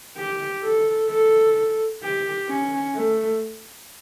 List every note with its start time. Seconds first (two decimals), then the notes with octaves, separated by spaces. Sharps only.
0.17 G4
0.64 A4
1.10 A4
2.03 G4
2.49 C#4
2.95 A3